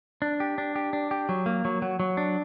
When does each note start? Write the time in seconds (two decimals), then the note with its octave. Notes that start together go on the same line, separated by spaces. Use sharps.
0.22 D4
0.40 G4
0.58 D4
0.76 G4
0.93 D4
1.11 G4
1.29 F#3
1.46 A#3
1.65 F#3
1.82 F#3
2.00 F#3
2.17 D4